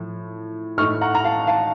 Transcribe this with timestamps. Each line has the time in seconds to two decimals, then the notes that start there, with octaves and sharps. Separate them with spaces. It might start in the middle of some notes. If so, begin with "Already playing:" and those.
Already playing: A2 F3
0.78 A2 A3 D#4 C#6 F6
1.01 F#5 A#5
1.15 A#5
1.24 F5 A5
1.47 F5 A5